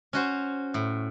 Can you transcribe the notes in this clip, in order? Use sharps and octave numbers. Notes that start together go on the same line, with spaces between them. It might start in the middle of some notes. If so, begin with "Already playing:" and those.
C#4 F#4 C5
A2